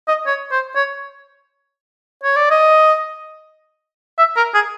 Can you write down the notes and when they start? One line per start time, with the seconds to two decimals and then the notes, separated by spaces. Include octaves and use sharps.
0.08 D#5
0.26 C#5
0.51 C5
0.76 C#5
2.23 C#5
2.36 D5
2.50 D#5
4.18 E5
4.36 A#4
4.54 G#4